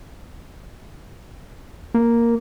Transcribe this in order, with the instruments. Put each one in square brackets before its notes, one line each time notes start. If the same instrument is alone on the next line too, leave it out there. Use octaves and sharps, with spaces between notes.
[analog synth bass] A#3